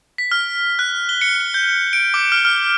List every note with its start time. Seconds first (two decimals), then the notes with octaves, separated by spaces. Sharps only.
0.18 B6
0.32 F6
0.79 F#6
1.09 G7
1.21 C#7
1.54 G6
1.93 D7
2.14 D6
2.32 F6
2.45 F6